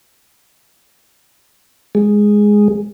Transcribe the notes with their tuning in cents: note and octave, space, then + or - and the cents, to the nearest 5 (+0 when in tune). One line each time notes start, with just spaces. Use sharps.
G#3 -5